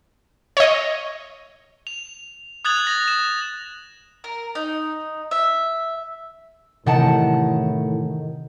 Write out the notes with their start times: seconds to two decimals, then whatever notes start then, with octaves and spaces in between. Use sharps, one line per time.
0.57 C#5 D#5
1.87 F7
2.65 D#6 F#6 G#6 A6 F7 F#7
2.87 A#6
3.08 E7
4.24 A#4
4.55 D#4
5.31 E5
6.86 A2 C3 D#3 E3 F#5 A5